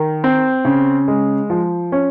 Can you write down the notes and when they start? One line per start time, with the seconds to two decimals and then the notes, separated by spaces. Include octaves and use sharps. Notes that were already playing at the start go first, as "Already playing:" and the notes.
Already playing: D#3
0.24 C4
0.65 C#3
1.08 G#3
1.50 F3
1.92 C#4